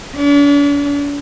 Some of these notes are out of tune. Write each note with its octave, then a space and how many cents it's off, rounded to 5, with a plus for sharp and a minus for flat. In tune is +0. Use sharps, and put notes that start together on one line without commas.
D4 -45